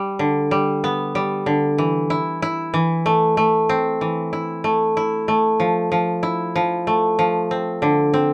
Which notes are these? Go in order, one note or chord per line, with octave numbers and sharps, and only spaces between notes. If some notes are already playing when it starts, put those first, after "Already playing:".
Already playing: G3
D3
G3
B3
G3
D3
E3
E4
E4
E3
A3
A3
C4
E3
E4
A3
E4
A3
F3
F3
E4
F3
A3
F3
C4
D3
C4